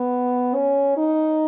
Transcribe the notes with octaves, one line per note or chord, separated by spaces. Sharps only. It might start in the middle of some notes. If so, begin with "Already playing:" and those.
Already playing: B3
C#4
D#4